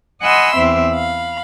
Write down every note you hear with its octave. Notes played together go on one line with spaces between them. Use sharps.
D#5 F#5 G#5 B5 C6 E6
E2 C4 E5
F5 B5